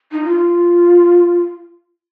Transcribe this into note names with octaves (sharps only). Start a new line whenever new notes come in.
D#4
F4